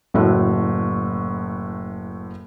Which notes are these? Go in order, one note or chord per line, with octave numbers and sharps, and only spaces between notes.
F#1 A2 A3 F#4